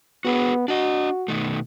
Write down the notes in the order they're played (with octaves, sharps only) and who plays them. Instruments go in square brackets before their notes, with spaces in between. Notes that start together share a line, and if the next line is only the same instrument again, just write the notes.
[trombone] B3 [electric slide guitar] F#4 G#4 B4
[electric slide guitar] D4 D#5 [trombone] F#4
[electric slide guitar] B2 D#3 A3